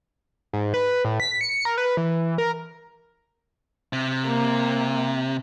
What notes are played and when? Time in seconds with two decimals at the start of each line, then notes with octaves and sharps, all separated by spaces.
0.53 G#2
0.74 B4
1.05 A2
1.20 B6
1.41 C#7
1.65 A#4
1.78 B4
1.97 E3
2.38 A#4
3.93 C3
4.27 A#3